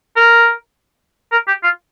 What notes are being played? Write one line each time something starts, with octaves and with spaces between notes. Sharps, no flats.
A#4
A#4
G4
F4